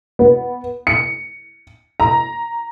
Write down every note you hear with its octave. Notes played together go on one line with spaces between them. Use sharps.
B3
C#7
A#5